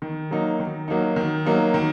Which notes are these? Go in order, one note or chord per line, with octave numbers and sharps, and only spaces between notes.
D#3
F#3 A#3 D#4
D#3
F#3 A#3 D#4
D#3
F#3 A#3 D#4
D#3